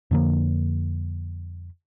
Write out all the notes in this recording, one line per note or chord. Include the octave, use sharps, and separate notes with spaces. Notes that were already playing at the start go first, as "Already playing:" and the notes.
F2 D3 F3 A#3